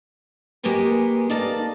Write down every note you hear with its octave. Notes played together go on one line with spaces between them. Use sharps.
G#3 A#3 G4 G#4 B4 C#5
A#3 D#4 A4 D5 A5